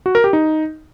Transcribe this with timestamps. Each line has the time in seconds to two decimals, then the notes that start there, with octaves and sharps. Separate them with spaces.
0.06 F#4
0.15 A#4
0.24 G4
0.33 D#4